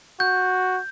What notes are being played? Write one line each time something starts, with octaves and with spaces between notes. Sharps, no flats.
F#4 G6